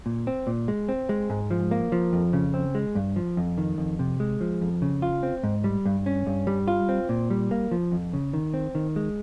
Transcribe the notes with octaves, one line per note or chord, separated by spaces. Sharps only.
A#2
C4
A#2
G#3
C4
G#3
G#2
F3
A#3
F3
F2
C#3
C4
G#3
G2
F3
F2
D#3
F2
C3
G#3
F3
F2
C#3
F4
C4
G#2
G3
G2
C#4
G2
G3
F4
C4
A#2
G3
A#3
F3
F2
C#3
D#3
C4
D#3
G#3